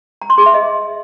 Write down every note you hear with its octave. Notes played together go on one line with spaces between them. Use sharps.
A#5
C6
G#4
E5
D#5